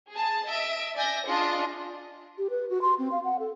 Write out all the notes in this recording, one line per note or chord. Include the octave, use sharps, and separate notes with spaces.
G#4 A5
D#5 E5 D7
D5 E5 G#5 G6 A#6
D4 F4 G#4 D#5
G4
B4
F#4
C6
C4
F5
F#5
A4